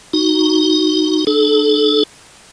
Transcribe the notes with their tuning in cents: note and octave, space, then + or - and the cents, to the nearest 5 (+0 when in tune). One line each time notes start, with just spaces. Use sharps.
D#4 +0 F#4 +0
D4 +40 A4 -30